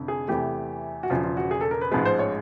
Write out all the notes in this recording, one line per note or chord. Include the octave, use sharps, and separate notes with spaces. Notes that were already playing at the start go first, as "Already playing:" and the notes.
Already playing: F1 F2 D3
G#4
E2 C3 E3 A3 G4
F#4
E1 E2 C#3 F3 F4
F4
F#4
G#4
A4
A#4
B4
A1 G#2 F3 G#3 B4
C5
C#5